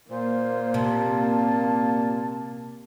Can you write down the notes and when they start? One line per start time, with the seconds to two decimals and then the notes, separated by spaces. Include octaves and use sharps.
0.10 A#2 A#3 C5
0.74 C3 A5